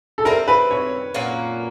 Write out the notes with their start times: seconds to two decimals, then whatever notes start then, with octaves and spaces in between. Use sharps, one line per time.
0.18 A4
0.25 G3 C4 E4 A#4
0.48 B4
0.71 C#5
1.14 A#2 F#3 A#3 C#4